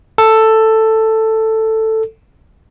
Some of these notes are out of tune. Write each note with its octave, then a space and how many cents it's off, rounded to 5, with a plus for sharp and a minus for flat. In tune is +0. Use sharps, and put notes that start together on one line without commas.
A4 +10